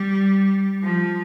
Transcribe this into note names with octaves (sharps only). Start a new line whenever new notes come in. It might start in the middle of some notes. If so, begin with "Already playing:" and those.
Already playing: G3
F3